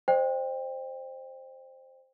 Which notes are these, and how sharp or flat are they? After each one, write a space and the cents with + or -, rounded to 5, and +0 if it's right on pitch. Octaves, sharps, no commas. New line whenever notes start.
C5 +5 D#5 -40 G5 +20